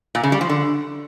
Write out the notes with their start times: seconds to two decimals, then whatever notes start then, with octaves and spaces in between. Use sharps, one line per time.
0.15 A#2
0.23 C#3
0.32 G3
0.41 F3
0.49 D3